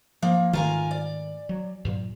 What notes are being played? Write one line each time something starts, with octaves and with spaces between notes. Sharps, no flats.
F3 A#3
G#2 D#3 A3 F4 A#4 G#5
D5
F#3
G2 A#2 F#3